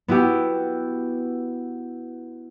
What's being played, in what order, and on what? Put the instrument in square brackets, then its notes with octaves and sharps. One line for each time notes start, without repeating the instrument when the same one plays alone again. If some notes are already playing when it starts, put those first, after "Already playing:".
[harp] B3 E4 F#4 G4